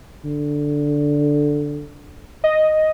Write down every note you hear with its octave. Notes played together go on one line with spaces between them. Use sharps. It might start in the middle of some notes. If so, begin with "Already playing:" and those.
D3
D#5